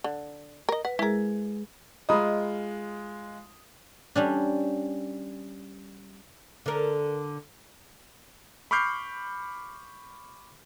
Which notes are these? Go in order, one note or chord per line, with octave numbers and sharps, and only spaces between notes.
D3
A#4 D#5
B4 F#5
G#3 E4 G#4 A#4
G#3 F4 D#5 A#5 B5 D#6
G3 C#4 D4
D3 A#4
B5 C#6 D6 F6 G6 C7